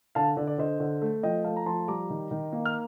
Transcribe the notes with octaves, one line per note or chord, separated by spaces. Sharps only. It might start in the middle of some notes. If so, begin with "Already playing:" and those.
D3 F5 A5
D3 D5
D5
D3 C5 D#5
D3
A3
F3 D#5 G5
A3 F5 A5
A#5
F3 A5 C6
G3 A#5 D6
D#3
D#3
A#3
F6